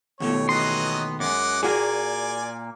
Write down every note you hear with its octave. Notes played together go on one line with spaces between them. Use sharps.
D#2 B2 A3 C#5
E3 F#3 B3 D#5 C6
F#2 G#3 F#5 D6
A#2 A#3 F#4 G#4 D5 G#5